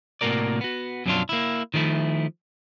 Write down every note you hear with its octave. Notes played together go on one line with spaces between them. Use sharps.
A2 C3 A#3 F#4 A#4 D5
B3 F#4
F#2 B2 F3 F#3 D4 F4
A#3 E4
D#3 F3 A3 E4